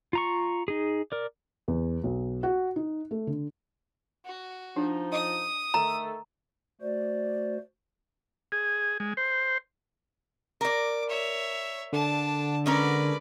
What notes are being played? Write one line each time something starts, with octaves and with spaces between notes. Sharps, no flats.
F4 A#5 C#6
D#4 G#4
A#4 D5
E2
B1
F#4
D#4
A3
D3
F#4
F3 D4 D#4
D#5 D#6
D#3 A3 A4 A#5
A3 F#4 C5 D5
G#4
G#3
C5
A#4 D5 D6
C#5 E5
D3 D4 A5
G#3 C#4 A#4 B4 D5